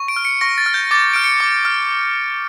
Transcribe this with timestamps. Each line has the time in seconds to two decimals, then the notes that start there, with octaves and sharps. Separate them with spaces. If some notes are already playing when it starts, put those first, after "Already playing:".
Already playing: C#6
0.08 D7
0.16 F6
0.25 C#7
0.41 C#6 A#6
0.58 A6
0.66 F6
0.74 G6
0.91 D6 A6
1.14 F6 D7
1.24 C#7
1.40 D6
1.65 F6